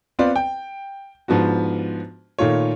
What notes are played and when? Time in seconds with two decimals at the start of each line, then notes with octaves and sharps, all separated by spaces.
0.19 B3 C4 F4 B4 D5
0.36 G5
1.28 G#2 F3 B3 D4 F#4
2.39 A#2 D#3 A3 F4 C#5